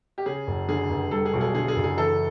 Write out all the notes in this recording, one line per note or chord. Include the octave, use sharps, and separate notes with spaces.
G4
C#3 G#4
F#1
D3 G#4
F1
G3 A4
G#4
B1
G#4
D3 G#4
G#4
F#1
G#4
E3 A4